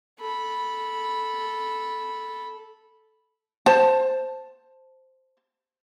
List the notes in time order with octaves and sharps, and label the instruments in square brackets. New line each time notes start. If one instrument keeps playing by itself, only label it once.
[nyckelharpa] A4 B5
[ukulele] C5 A5